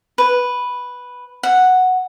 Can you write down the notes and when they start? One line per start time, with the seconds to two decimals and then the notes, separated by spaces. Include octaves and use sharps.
0.18 B4
1.43 F#5